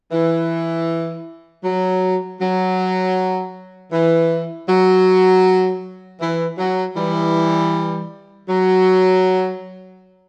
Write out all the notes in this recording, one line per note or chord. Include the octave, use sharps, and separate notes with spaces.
E3
F#3
F#3
E3
F#3
E3
F#3
E3 G3
F#3